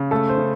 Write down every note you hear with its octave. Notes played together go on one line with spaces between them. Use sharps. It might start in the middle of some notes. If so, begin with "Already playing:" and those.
Already playing: C#3
A3 A4
C5
C#3